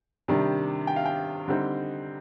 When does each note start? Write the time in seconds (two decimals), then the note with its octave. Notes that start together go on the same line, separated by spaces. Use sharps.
0.28 C3 D#3 G3 D4
0.87 G5
0.96 F5
1.06 G5
1.48 D3 G3 C4 D#4